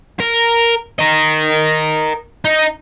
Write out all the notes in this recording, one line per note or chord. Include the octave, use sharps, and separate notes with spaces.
A#4
A#4 D#5
D#4